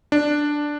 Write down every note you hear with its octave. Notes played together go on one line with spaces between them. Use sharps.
D4